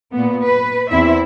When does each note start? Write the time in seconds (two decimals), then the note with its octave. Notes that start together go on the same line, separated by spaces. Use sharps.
0.13 A#2 B3
0.45 B4
0.91 E2 C4 E4 E5